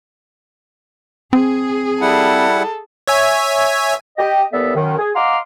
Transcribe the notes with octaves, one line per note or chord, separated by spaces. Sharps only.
C4 G#4
G3 E4 A4 F#5
C#5 E5 G#5
G4 D#5
D#2 E3 G3 B3 A4 E5
F#2 D#3
G#4
D#5 F5 F#5 A#5 C6 D6